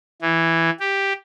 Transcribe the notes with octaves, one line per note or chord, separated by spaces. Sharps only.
E3
G4